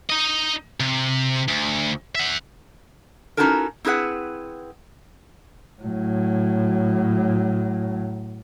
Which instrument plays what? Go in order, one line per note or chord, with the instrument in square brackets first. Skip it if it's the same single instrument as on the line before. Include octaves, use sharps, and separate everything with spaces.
[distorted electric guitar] D#4 D#5
C3
D2
E5 F#5
[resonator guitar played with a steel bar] C#4 D#4 E4 F#4 A4 A#4
C4 E4 G#4 B4 F#5
[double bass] A2 F#3